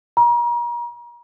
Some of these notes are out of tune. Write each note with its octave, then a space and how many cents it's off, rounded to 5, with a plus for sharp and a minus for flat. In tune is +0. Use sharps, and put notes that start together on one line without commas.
A#5 +35